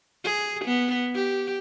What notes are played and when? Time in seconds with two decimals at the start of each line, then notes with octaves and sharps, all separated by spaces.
0.24 G#4
0.65 B3
1.15 G4